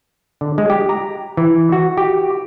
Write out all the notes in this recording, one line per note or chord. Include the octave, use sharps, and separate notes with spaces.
D3
G#3
G4
A#5
E3
F#4
G4